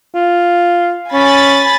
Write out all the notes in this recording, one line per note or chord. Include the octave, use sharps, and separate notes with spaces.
F4
C#4 G#5 B5 A6